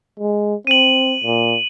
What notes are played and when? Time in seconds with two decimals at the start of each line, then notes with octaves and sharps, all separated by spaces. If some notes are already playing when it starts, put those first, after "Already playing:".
0.20 G#3
0.67 C4 D#7 F#7
1.24 A#2